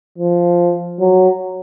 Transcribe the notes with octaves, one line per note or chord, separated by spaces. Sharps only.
F3
F#3